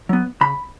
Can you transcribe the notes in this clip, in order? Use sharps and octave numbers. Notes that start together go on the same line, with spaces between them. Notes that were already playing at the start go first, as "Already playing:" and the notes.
F#3 B3
C#3 B5